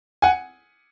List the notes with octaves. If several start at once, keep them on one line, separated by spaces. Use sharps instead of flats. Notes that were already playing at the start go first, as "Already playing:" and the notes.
F#5 G#5